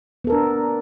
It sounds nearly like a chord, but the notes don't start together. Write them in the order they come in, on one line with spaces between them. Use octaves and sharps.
B3 A4 A#4 D4